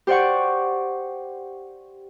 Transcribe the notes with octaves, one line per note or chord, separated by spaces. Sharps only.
G4 C5 D5 F#5 C#6